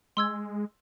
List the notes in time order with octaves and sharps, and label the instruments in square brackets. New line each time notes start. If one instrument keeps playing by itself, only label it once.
[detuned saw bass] G#3 [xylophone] C6 E6 G#6